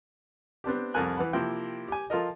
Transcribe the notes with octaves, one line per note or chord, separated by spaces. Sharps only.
B3 C4 D4 G4
C2 F2 A4 A#4 G#5 F#6
E3 B4 F#5 B5
C3 F3 A#3 E4 G5
G4 G#5
F3 F4 A4 A#4 D#5